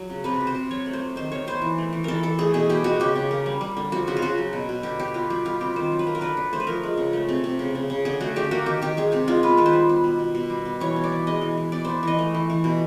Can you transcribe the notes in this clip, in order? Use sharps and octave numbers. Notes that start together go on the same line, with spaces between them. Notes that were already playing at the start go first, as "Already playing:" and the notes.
Already playing: F#3
C#3
C3 B4
C3
C5
C3
F#3 C#5
A3
C5
A3
D#3 C5
D#3 C#5
B3 C5
E3
A3
E3
E3 A4 A#4
E3 A4
A3 G#4
B2 G#4
B2 G4
G#3 F#4
C#3 G4
C#3
A#3
G3
G3
D3
F3 F#4
C#3 F#4
F4
C#3 F#4
F#3
B2
B2
D3 G4
D3 G4
B3 F4
G3 G4
B3 F4
C3 G4
D#3 C5
F#3
B4
A#3
A#4
D3 B4
D3
A3 C5
B4
F3 A#4
G#3
C#3
A3
C3
C3
C#3
C#3
C#3
D3 G#4
A3 F#4
D3 G4
A#3 F#4
D#3 G4
D#3 G4
G#3 G#4
C3 G4
G#3 F4
B3 B4
D#3 B4
C5
G3
B3
B2
B2
B2
G3
B3
E3 C#5
B3
D5
E3
G#3 D#5
E3
E3
B3 D5
B3 C5
E3 D#5
A3
E3
E3
B2